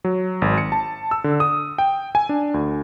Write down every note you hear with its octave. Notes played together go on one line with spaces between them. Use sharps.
F#3
G#1
C#7
A5
E6
D3
D#6
G5
G#5
D4
D2